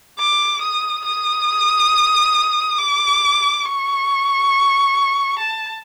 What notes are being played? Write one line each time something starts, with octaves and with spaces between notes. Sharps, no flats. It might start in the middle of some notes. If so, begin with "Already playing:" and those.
D6
D#6
D#6
D6
C#6
A5